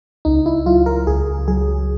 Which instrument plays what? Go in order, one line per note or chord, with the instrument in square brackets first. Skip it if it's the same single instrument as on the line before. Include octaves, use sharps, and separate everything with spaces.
[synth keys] C#2 [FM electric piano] D#4
[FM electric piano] E4
[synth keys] F#3 [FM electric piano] F4
[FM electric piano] A#4
[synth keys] C#2 [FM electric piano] G#4
[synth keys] F#3 [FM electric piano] G#4